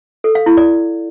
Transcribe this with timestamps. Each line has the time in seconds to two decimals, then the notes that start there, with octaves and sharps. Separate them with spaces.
0.24 A4
0.35 F5
0.46 E4
0.57 D5